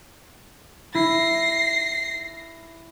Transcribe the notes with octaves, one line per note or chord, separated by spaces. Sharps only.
E4 A#6 C7